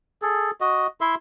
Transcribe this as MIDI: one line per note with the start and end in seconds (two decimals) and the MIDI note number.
0.22 0.51 68
0.22 0.51 69
0.61 0.87 66
0.61 0.87 75
1.01 1.15 64
1.01 1.15 76
1.01 1.15 84